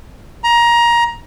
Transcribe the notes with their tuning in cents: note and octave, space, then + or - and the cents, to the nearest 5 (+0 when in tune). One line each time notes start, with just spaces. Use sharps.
A#5 +20